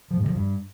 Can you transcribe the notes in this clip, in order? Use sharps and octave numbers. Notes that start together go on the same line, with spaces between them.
F3
G#2
D3
F3
G2